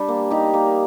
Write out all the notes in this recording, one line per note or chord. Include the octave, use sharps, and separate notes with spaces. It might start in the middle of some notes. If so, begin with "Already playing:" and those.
Already playing: G3 D4
A#3
D#4 G4
A#3